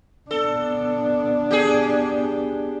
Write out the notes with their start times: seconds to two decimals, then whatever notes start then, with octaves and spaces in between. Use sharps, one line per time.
0.31 B3 D4 A4
1.51 G4 G#4